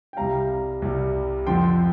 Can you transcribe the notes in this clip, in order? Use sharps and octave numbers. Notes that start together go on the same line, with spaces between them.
G5
C2 C3 G3 F5 A#5
C2 C3 G3
F2 D3 F3 G5 C6